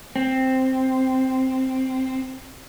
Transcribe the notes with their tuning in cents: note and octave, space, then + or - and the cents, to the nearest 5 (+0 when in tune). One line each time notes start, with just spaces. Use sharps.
C4 +0